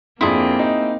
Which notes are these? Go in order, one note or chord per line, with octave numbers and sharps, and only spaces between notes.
F2 A#3 C4 D4 E4 G#4 C6
D#4